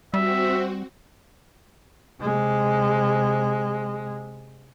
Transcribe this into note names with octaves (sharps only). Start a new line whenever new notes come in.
G3 C4 F#4 E5
C3 G#3